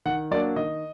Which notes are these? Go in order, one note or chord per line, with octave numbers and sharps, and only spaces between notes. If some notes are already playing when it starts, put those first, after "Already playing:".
D#3 F#5
F#3 A#3 D4 D5
D#3 D#5